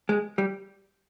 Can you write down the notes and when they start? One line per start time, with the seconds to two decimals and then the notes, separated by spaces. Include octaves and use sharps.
0.09 G#3
0.38 G3